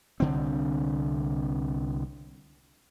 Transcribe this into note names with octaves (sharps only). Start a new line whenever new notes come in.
C2 D3 C4